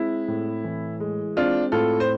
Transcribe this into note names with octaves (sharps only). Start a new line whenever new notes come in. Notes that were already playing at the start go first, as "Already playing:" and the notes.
Already playing: G#3 C4 E4
A2
E3
G#3
C4 D4 F4
A2 F4 A4
C5